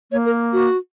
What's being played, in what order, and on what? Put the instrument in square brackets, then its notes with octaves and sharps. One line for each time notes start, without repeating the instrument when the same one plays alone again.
[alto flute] A#3 [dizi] C#5
[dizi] A#4
F#4